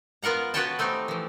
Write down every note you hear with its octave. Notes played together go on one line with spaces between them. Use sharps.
B3 F4 A#4 F#5 A#5
B3 F#4 B4 C#5 G5 A5
A3 C4 D#4 F#4 G4
E3 F3